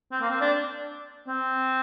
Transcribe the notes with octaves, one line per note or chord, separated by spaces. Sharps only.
C4
A#3
C4
D4
C4